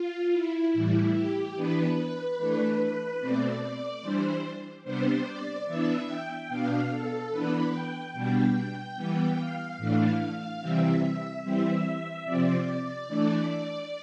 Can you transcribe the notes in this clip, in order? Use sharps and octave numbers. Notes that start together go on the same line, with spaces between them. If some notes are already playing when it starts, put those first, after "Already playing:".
Already playing: F4
E4
A2 E3 G3
G4
E3 B3 D4 B4
B4
E3 A3 D4
B2 A3 C4 D5
D5
E3 G3 D4 C5
C3 G3 B3 D4 C5
D5
E3 B3 D4 E5
G5
B2 B3 D4 F5
A4
E3 B3 D4 B4
G5
B2 G3 B3 D4 G5
E3 G3 B3
F5
A2 E3 A3 D4
C3 E3 G3 C4 E5
E5
E3 G3 C4 E5
C3 F3 C4 D5
E3 A3 D4
D5